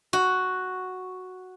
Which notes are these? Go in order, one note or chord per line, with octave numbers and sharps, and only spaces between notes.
F#4